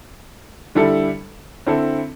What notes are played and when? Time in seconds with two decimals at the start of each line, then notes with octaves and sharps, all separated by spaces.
0.75 D3 G3 E4 A4
1.66 D3 C4 E4 A4